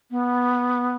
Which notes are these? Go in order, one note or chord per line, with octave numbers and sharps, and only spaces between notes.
B3